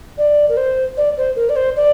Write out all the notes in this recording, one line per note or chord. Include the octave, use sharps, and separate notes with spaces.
D5
A#4
C5
D5
C5
A#4
D5
C5
D5